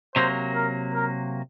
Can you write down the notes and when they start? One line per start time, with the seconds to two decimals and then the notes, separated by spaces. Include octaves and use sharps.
0.15 C3 F#3 A#3 C5
0.55 A#4
0.94 A#4